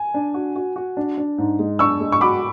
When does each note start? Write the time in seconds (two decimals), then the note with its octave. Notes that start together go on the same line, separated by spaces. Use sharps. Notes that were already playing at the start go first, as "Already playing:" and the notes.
Already playing: G#5
0.14 D4
0.34 F#4
0.56 F#4
0.76 F#4
0.97 D4
1.18 D4
1.38 G#2
1.59 G#3
1.79 D4 C#6 E6
2.01 G#3
2.12 C#6
2.21 F#4 B5 D6